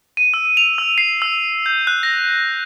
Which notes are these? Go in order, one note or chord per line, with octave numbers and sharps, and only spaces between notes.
D#7
E6
F7
E6
C7
E6
G6
F#6
A#6